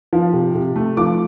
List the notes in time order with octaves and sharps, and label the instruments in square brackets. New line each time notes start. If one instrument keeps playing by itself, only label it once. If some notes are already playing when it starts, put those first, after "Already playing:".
[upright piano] F3
C3
C3
A3
F3 D6